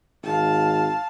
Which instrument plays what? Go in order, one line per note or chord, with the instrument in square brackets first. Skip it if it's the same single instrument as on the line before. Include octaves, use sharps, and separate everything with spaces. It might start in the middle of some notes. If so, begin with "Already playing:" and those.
[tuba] G#1 [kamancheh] F5 A5